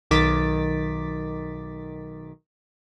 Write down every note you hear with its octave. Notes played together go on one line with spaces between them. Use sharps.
B1 D#3 D6 A6 B6